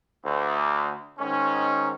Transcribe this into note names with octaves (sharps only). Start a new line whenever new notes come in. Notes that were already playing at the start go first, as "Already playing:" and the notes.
D2
G#2 D#3 C#4